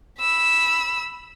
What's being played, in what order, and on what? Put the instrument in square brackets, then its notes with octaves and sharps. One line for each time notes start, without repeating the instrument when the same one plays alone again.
[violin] B5 E6